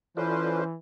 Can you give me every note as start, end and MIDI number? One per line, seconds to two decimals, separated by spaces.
0.17 0.77 52
0.17 0.64 61
0.17 0.62 65
0.17 0.62 69
0.17 0.64 71
0.17 0.64 72
0.17 0.62 74